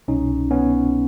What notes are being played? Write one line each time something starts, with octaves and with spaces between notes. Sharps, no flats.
C2 B2 C#4 D#4
B3 C#4